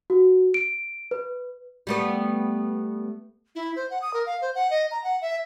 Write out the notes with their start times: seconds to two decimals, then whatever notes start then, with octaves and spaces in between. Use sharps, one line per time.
0.10 F#4
0.54 D7
1.11 B4
1.87 G3 A3 B3
3.55 E4
3.76 C5
3.90 F#5
4.02 D#6
4.14 A#4
4.26 F5
4.42 C5
4.55 F#5
4.70 D#5
4.91 A#5
5.04 F#5
5.22 E5